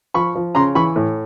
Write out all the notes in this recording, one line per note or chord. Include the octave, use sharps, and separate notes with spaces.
F3 B5 C#6
F3
C#3 A#5 C6
E3 B5 C#6
A2